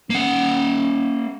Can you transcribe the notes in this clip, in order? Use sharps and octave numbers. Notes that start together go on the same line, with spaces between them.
A#3 C#4 F#5